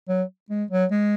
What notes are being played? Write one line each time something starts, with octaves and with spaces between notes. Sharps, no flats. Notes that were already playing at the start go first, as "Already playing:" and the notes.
F#3
G#3
F#3
G#3